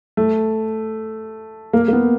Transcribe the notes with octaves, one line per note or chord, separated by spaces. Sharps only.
A3
A#3
A#3
B3